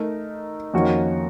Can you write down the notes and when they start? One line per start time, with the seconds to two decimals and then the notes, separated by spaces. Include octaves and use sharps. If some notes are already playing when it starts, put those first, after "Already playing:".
Already playing: A3 D#4 A#4
0.74 F2 D#3 A#3 C#4 F#4